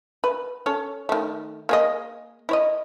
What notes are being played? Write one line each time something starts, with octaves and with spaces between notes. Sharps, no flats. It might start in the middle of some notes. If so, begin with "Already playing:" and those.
B4
C#4 A4 C#5
D#3 A3
A#3 G#4 D#5
E4 C#5 D#5